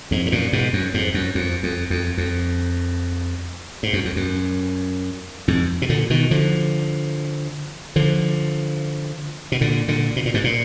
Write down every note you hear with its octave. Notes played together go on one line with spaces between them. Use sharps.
F2 G#2
G#2
F#2 A#2
G#2 B2
F#2
F2 G#2
F#2
F2
F2
F2
F2
G#2
F#2
F2
F#2
F2 G#2
B2
A#2 D3
B2 D#3
D3 F3
D3 F3
B2
A#2 D3
A#2 D3
B2
A#2
G#2 B2
A#2